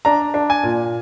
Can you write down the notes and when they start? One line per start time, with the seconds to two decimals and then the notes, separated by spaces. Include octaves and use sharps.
0.05 D4 A#5
0.34 D4
0.50 G#5
0.63 A#2